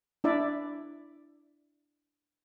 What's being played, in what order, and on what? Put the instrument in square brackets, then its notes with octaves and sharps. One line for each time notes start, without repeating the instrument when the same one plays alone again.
[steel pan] D4 E4 D5 E5